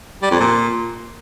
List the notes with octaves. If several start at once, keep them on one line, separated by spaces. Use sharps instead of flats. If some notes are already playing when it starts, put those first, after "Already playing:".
G3
F2
A#2